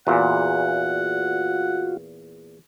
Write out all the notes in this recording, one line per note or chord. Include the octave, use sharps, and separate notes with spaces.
E2 A#2 F4 F#4 F#5